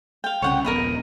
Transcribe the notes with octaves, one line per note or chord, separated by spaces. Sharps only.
F5 G5
C2 C#3 C#5 F#5 G5
D#1 A#1 B3 A#4 D#5 B5